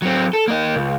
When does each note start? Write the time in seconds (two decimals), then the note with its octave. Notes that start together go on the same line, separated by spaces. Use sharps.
0.02 F#3 C4
0.33 A4
0.48 A#3 D#5
0.76 C#2